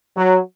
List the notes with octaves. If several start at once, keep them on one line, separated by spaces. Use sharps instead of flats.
F#3